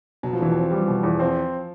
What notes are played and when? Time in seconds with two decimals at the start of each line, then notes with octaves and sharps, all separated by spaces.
0.23 B2 F#3
0.33 F3
0.39 E2 E3
0.51 F3 C4
0.71 G3
0.88 B2
1.03 E2
1.19 F3 C4